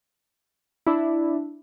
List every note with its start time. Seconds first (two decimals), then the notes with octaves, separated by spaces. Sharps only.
0.87 D4 E4